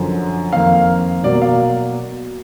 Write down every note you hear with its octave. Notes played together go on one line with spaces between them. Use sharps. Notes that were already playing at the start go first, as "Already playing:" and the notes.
Already playing: F#2 D3 F3
F2 D#3 A#3 F5
B2 F#3 A#3 D5
F5